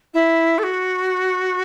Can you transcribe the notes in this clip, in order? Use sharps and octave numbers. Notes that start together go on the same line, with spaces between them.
E4
A4
F#4